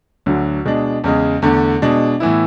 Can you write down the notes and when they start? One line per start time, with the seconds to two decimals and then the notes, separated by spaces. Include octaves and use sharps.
0.26 D2 D3 F#3
0.65 B2 G#3 D4
1.04 E2 C#3 G#3
1.42 E2 D3 A3
1.82 B2 G#3 D4
2.20 A2 E3 B3 E4